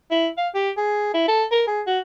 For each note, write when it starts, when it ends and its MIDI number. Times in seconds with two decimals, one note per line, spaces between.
0.11 0.27 64
0.37 0.48 77
0.54 0.70 67
0.77 1.09 68
1.14 1.24 64
1.28 1.44 69
1.51 1.62 70
1.67 1.81 68
1.87 1.99 66